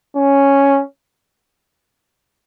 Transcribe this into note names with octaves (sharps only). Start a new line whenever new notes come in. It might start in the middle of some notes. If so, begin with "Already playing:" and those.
C#4